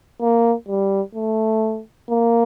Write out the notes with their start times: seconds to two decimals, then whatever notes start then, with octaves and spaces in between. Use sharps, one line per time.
0.21 A#3
0.68 G3
1.15 A3
2.10 A#3